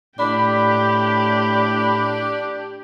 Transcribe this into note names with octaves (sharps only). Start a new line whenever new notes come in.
A2 D4 G4 B5